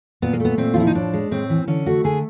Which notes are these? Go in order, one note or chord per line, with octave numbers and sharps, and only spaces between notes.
A#2 B3
A#3
A3 B3
A#2 C4
F4
F3 E4
D#4
A2 D4
G#3
A2 C4
E3
D3 C#4
A3 F#4
D3 G#4